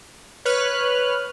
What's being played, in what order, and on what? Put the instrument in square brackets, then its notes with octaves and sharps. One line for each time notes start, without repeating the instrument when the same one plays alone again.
[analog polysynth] B4 C#5 F6 F#6